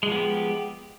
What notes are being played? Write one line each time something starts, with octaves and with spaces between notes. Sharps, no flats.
F3 G#3 B3 G4